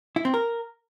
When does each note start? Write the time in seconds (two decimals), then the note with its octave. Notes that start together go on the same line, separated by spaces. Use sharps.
0.16 E4
0.25 C4
0.34 A#4